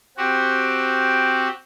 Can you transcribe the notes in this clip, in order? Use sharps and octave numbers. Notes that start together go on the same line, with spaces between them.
C4 F#4 G4